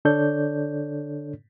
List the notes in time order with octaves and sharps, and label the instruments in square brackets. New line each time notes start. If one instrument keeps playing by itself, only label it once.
[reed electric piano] D3 D4 A4 C#5 D5 G6